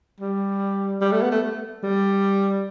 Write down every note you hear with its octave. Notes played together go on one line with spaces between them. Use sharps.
G3
G3
A3
B3
A3
G3